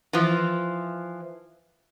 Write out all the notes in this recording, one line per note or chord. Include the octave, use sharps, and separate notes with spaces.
E3 F3